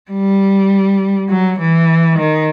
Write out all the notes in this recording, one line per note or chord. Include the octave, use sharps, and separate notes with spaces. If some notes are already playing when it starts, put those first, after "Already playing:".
G3
F#3
E3
D#3